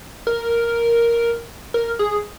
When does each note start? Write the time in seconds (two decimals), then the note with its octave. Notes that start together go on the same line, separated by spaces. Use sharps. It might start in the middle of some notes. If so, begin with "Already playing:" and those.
0.27 A#4
1.74 A#4
1.99 G#4